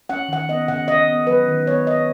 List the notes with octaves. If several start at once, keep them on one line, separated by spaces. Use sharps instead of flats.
C#4 F#5
D#3 F#5
B3 D#5
C#3 F#5
C#3 D#5
B3
F#3 B4
D#3
B3 C#5
D#3 D#5